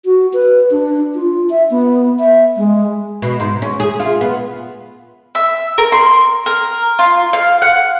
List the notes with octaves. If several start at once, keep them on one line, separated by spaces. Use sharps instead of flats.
F#4
B4
D4
F4
E5
B3
E5
G#3
B2
G#2
C#4
G#4
F4
B3
E5
A#4
C6
A#4
F4
F5
F#5